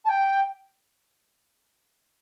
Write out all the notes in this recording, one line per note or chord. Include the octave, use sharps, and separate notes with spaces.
A5
G5